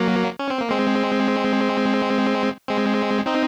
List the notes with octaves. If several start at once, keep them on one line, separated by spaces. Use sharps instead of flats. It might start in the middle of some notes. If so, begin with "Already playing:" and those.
Already playing: F#3 A#3
C#4
C4
A#3
G#3 C4
G#3 C4
C4 D#4